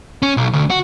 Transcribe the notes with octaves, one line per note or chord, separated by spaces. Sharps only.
C#4
B1
D2
F#4